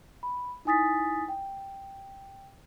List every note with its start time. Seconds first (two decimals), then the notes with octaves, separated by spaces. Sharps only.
0.23 B5
0.65 D#4 E4 G#5 D#6 A6 B6
1.29 G5